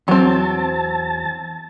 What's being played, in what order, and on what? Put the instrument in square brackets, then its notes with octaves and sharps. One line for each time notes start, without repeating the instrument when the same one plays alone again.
[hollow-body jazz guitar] E2 [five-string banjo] F#3 C4 [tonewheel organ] A5